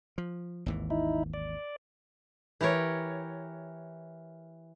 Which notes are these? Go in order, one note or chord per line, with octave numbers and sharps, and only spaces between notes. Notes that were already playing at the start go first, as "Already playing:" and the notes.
F3
G#1 D#2 E3
D#4 E4
D5
E3 G4 A#4 C#5